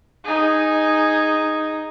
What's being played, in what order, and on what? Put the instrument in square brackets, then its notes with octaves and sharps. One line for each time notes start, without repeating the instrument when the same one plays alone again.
[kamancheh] D#4 G#4